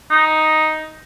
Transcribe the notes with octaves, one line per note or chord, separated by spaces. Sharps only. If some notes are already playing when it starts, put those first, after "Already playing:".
D#4